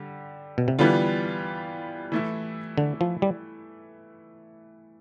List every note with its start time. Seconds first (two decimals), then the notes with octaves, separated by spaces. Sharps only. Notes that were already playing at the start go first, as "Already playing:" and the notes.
Already playing: D3 G3
0.58 B2
0.68 C3
0.79 D3 E3 G3 B3 F4
2.12 E3 A3 E4
2.78 D3
3.01 F3
3.22 G3